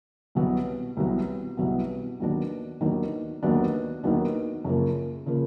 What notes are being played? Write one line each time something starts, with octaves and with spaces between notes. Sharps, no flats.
C2 B2 F#3 B3
C2 B2 F#3 B3
C2 B2 F#3 B3
D#2 D#3 F#3 B3 D4
D#2 D#3 F#3 B3 D4
D#2 D#3 F#3 B3 D4
D#2 D#3 F#3 B3 D4
F#2 C#3 F3 A#3
C#3 F3 A#3